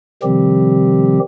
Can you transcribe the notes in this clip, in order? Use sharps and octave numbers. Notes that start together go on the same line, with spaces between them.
C3 D#3 F3 G3 C4 G4